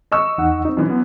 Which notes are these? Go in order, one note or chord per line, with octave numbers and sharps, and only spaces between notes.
D#5 C#6 E6
E2 D#4 F#5
C4 D#4
F#2 E3
B3